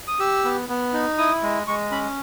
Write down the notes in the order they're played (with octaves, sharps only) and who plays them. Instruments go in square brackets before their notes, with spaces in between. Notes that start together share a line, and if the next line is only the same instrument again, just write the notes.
[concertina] D#6
G4 E6
B3
B3
D#4
E4 D#6
G#3
G#3 C#6
C#4 B5